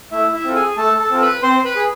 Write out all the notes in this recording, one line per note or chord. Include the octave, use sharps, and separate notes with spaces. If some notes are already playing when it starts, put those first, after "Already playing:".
A3 E4 E5
E4 E5
C4 F4 A4
G#4 G#5
A3 A4 A5
A4 A5
C4 F4 A4
B4 B5
C4 C5 C6
B4 B5
G#4